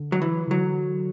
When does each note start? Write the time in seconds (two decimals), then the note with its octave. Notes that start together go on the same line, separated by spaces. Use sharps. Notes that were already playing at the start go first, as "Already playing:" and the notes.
Already playing: D3
0.12 F#3
0.22 E3
0.47 C#3
0.51 D3 F#3